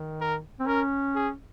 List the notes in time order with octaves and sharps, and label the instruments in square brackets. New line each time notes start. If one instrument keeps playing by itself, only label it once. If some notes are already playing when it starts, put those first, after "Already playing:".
Already playing: [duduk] D#3
[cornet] A#4
[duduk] C4
[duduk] C#4 [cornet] A#4
[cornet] G#4